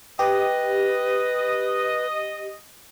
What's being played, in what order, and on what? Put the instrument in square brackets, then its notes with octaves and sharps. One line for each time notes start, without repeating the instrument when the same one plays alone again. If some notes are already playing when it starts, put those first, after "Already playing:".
[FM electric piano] G4 [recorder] B4 [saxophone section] D#5